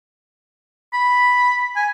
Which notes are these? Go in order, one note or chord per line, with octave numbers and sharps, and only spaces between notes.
B5
G#5